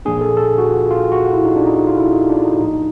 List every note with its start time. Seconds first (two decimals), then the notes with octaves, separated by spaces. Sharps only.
0.05 A#2 F3 A#3 D4 G#4
0.21 A4
0.37 A4
0.58 F#4
0.69 F4
0.91 F4
1.12 F#4
1.33 E4
1.45 D#4
1.56 D4
1.66 D#4
1.87 F4
1.97 E4
2.13 D#4
2.29 D4
2.45 D#4
2.61 A2 F3 A#3 D#4